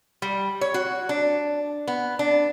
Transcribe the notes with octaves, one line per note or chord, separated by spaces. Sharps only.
G3
C#5
F#4
D4
B3
D4